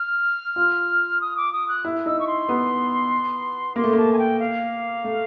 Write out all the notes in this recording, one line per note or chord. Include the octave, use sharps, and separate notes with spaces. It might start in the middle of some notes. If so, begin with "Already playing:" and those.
Already playing: F6
F4
D#6
D6
D#6
F#6
E4
D#4 E6
C#6
C6
B3
A#3 C6
A3
A#3 A5
G#5
G5
F5
A3